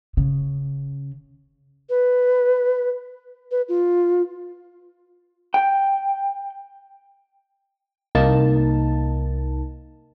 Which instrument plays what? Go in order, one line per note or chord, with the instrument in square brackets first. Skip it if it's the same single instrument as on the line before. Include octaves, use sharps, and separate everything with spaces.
[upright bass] C#3
[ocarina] B4
B4
F4
[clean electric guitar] G5
[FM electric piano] C2 A#3 D#4 A5